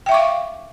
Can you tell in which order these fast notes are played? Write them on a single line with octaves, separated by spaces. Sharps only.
G5 E5 C#6 D6 F5